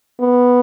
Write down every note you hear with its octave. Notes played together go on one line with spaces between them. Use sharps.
B3